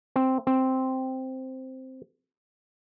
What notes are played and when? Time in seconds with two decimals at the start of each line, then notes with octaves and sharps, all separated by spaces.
0.16 C4
0.47 C4